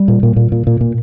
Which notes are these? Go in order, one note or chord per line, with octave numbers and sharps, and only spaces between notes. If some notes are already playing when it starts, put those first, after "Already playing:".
Already playing: G3
A#2
A#2
A#2
A#2
A#2
A#2